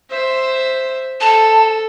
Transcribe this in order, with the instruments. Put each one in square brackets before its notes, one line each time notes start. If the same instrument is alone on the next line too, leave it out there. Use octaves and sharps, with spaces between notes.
[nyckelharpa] C5 E5
[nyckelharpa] A4 [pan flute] A5